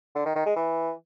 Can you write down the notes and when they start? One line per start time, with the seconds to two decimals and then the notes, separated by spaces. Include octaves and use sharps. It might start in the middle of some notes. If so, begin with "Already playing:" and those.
0.15 D3
0.25 D#3
0.36 D#3
0.46 G#3
0.56 E3